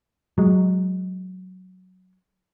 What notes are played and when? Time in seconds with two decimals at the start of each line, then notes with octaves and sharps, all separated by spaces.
0.38 F#3 G#3